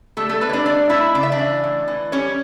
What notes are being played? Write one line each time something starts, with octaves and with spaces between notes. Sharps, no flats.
G3 A3 A4
A3 A4
G3 B3 B4
C#5
D4 D5
A3 D4 D5
A3 E4 E5
C#3 D5
E5
D4 D5
E3
A2
E3
G3 C#4 C#5